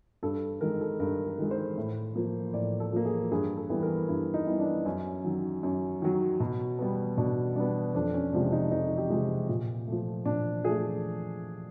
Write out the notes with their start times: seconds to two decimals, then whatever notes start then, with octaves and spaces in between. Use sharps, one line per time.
0.23 G2 A4
0.61 D#3 G#3 A#4
0.80 A4
1.00 G2 A#4
1.26 A4
1.39 D#3 G#3
1.51 C5
1.77 A2
2.15 F3 A#3
2.54 A2 D5
2.80 A4
2.93 F3 A#3
3.05 G#4
3.31 G2 G#4
3.57 A4
3.70 E3 G3 B3
3.83 A#4
4.08 G2 E4
4.34 D#4
4.47 E3 G3 B3
4.60 D4
4.86 F#2 C#4
5.24 D#3 F#3
5.63 F#2
6.02 D#3 F#3
6.40 B2
6.79 G3 B3
7.17 B2 D4
7.56 G3 B3 D4
7.94 F2 D4
8.14 C#4
8.33 C3 F3 G#3 D4
8.52 D#4
8.71 F2 D#4
8.98 G4
9.10 C3 F3 G#3
9.49 A#2
9.87 F3 A3
10.25 A#2 D4
10.64 F3 A3 G#4